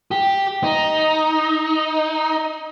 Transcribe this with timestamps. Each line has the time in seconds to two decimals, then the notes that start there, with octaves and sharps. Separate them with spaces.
0.11 G4
0.64 D#4